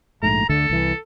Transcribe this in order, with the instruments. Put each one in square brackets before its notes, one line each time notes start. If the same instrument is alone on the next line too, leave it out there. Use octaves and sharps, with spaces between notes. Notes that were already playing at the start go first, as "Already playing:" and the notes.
[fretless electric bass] A#1 G#2 A3 [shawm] A#5
[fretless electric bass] D2 D3 A3 [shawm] A4
[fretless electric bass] C2 E3